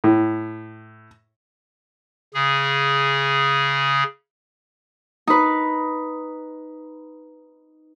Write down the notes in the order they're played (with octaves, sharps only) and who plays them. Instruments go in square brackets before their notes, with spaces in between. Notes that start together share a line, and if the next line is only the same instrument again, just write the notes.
[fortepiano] A2
[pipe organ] C#3 G#4
[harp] D#4 B4